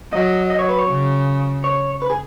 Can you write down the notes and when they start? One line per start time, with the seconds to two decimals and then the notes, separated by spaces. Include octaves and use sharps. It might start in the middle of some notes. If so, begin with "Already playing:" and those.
0.12 F#3 D#5
0.50 D#5
0.59 C#5
0.69 B4
0.79 C#5
0.88 C#3
1.64 C#5
2.02 B4
2.10 G#4